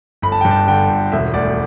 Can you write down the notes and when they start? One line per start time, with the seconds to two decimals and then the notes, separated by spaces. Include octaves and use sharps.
0.22 G1 B5
0.32 A5
0.41 G2 G5
0.51 A5
0.67 D3 G5
0.89 G1
1.12 E1 E5
1.34 D2 D5